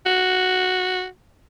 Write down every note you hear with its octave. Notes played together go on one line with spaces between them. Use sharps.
F#4